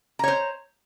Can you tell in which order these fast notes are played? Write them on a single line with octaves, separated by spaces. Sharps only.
A#5 C#5 C5